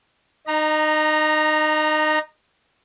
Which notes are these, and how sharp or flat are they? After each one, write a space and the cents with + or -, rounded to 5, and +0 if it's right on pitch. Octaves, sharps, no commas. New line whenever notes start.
D#4 -25 A#5 +0